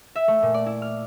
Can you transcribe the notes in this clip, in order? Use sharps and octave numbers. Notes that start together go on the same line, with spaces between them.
E5
A3
A#2
D5
E4
F6